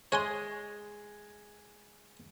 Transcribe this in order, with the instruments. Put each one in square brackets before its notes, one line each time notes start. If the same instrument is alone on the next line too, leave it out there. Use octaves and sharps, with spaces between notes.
[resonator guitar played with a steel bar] G#3 [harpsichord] C#5 G#5 C6